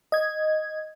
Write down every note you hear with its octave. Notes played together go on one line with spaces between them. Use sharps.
D#5 G#6